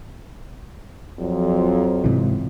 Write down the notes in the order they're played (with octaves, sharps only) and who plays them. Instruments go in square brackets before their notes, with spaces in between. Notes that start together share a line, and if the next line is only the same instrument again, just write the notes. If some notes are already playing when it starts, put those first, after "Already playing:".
[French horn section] F2 F3 F#3
[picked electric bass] G#2 C3 E3